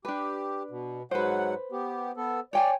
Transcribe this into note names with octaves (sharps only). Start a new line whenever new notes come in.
D4 G4 B4
B2
G#2 F#3 B4 C5 F#5
B3 G4
B3 A4
C#5 D5 G5 G#5